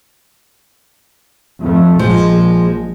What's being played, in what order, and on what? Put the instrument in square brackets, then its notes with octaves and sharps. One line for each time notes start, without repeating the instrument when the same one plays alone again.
[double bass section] F2 A3
[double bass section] A#1 G#3 [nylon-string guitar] F3